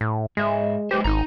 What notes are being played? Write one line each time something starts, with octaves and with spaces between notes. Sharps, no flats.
A2
G#2 G#3 E5
G#3 G4 B4 C5
G#1 D#4 A#5